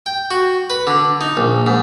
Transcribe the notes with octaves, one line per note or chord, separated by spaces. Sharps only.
G5
F#4
B4
D3
D#4
A#1
G#2